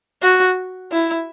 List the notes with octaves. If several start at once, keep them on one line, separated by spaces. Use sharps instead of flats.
F#4
E4